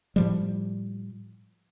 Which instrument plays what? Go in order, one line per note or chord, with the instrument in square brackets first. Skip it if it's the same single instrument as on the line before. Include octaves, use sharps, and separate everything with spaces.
[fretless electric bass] A2 F3 G3